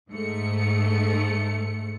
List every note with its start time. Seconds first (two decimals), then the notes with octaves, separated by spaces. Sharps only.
0.11 G#2 A3 C#7